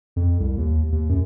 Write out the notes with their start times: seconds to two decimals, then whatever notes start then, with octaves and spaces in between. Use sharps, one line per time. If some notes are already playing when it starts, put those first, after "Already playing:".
0.16 F2
0.40 C2
0.58 D#2
0.92 D#2
1.09 F#2